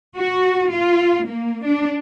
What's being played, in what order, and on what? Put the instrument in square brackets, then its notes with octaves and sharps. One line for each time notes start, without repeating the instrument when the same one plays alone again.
[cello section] F#4
F4
A#3
D4